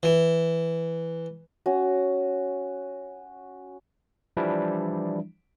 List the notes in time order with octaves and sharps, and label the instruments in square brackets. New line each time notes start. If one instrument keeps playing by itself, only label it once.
[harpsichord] E3
[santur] C#4 F#4
[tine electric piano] E3 F3 G3 D4 E4